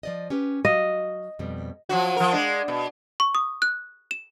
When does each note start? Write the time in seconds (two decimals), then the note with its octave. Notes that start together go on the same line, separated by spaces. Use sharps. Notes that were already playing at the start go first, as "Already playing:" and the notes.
0.03 F3 D5 D#5
0.30 C#4 G4 B4
0.65 F#3 F#4 D#5 F5
1.39 F2 B2 G3
1.89 F3 F#3 F#4
2.16 F3 A#4
2.32 G#3 D4
2.68 B2
3.20 C#6
3.35 D#6
3.62 F#6
4.11 E7